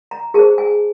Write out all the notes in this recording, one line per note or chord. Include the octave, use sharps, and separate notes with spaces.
A#5
G#4 C5 A5
G#5